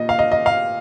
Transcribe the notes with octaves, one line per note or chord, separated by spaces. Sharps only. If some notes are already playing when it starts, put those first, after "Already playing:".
Already playing: A#2 D#5
F5
D#5
D#5
F5